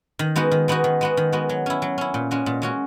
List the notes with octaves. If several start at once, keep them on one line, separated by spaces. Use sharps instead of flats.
D#3
G#3 B3 D#4 F#4
D#3
G#3 B3 D#4 F#4
D#3
G#3 B3 F#4
D#3
G#3 B3 F#4
F#3
C#4 E4
F#3
C#4 E4
A#2
G#3 C#4 F#4
A#2
G#3 C#4 F#4